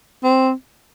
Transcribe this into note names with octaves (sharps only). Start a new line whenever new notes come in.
C4